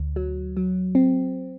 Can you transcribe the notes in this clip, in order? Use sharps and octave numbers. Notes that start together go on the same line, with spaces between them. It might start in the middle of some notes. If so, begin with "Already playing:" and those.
Already playing: D2
F#3
F#3
C4